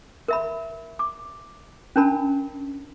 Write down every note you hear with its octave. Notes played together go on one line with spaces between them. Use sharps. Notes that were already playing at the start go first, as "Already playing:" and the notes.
A#4 E5 B5
D6
C#4 D4 A#4 A5 B5